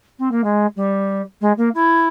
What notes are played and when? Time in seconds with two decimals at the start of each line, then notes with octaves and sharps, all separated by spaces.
0.18 C4
0.31 A#3
0.43 G#3
0.76 G3
1.41 G#3
1.57 A#3
1.74 E4